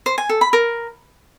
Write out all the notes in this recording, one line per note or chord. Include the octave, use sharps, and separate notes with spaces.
C5
G#5
A4
B5
A#4